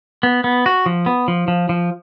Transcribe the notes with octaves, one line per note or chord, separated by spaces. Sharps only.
B3
B3
F#4
F3
B3
F3
F3
F3